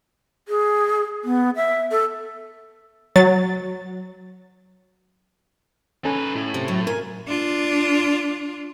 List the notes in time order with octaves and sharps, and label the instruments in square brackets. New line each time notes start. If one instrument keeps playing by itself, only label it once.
[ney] G#4
B3
E5
A4
[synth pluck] F#3 A6
[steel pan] C#4 A4 G#5 [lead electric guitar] D#4 B4
[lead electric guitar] A2 [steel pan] E4
[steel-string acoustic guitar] C3
G#2 F#3
[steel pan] A#4 [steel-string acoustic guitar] G#5
[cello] D4 F4